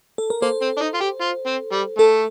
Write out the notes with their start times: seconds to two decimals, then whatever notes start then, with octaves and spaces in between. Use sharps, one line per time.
0.18 A4
0.30 A#4
0.42 A#3 A4 C5
0.62 C4
0.77 D4
0.81 D#4
0.94 F4
1.01 G4
1.21 F4
1.46 C4
1.72 G3
1.98 A3 A4